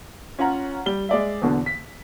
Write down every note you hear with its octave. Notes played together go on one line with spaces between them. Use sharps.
C#4 F4 C#5 F#5 A#5
G3 G7
G#3 D5 E5
E2 B2 D3
B6